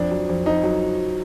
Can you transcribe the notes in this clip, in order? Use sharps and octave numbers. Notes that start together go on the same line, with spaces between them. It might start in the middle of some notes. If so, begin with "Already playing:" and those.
Already playing: F2 D4
F#3
F2
F2 D#4
F#3